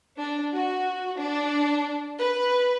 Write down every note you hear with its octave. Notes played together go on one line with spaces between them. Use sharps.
D4
F#4
D4
B4